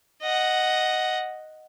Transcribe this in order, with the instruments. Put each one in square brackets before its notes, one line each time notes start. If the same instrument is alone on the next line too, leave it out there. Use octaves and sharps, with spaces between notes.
[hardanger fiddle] D#5 F#5